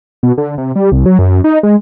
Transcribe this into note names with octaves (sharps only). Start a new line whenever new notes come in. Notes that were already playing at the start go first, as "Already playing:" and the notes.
B2
D3
C3
G3
C2
F#3
F#2
D#4
G#3